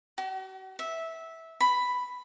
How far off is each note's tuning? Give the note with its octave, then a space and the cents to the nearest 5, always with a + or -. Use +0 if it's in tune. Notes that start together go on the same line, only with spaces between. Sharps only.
F#4 +45
E5 -10
B5 +5